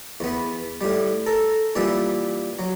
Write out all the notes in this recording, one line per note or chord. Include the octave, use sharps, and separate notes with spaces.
E2 B3
A2 G3
A4 A#4
A#2 E3 G3 E5
F#3